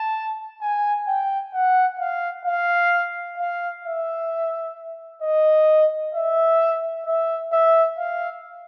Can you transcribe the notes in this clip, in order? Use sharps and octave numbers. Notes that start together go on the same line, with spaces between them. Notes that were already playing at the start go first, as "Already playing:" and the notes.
Already playing: A5
G#5
G5
F#5
F5
F5
F5
E5
D#5
E5
E5
E5
F5